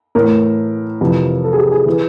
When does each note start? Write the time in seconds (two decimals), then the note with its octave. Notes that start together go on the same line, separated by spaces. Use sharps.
0.15 A2 E3 A#4
1.01 F2 C3 E3
1.44 A4
1.53 G#4
1.58 G4
1.72 G#4
1.86 E3